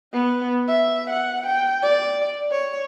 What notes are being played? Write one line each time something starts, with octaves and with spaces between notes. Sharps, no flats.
B3
E5
F#5
G5
D5
C#5